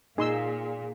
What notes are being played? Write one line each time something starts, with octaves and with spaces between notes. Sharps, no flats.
A#2 D#4 G#4 C6 E6